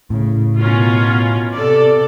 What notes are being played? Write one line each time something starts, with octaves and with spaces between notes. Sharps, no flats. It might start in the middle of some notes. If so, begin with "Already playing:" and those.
A2 C#3
B2 C#4 F4 A#4
C3 A4 D5